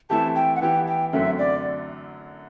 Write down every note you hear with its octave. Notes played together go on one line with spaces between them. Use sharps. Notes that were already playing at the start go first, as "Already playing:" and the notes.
E3 A3 C4 E4 G4 A5
G5
F#5
E3 B3 E4 G4 G5
G5
F#2 D3 F#3 A3 C4 E5
D5